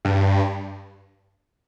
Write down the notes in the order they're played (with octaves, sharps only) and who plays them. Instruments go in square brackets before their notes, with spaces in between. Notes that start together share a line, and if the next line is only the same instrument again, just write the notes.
[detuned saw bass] G2